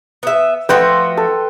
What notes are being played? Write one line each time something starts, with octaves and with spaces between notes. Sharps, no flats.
B3 E5
F3 A3 F#4 B4 G5 C6
A4